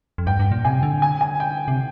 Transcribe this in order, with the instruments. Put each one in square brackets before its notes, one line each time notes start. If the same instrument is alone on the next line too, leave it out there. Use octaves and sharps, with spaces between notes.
[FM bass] F2
[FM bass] G2 [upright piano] G5
[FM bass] G2
A#2
[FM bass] C3 [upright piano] G#5
[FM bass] D3
[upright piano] G#5
G#5
G5
[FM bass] C3